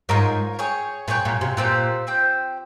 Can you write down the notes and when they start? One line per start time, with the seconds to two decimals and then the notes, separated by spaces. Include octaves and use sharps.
0.09 G#2 F4 A#4 C#5
0.59 G#4 C#5 G5
1.08 A#2 G#4 C#5 G5
1.25 A#2
1.41 C3
1.57 A#2 C4 G4 C5 G5
2.07 C4 G4 C5 G5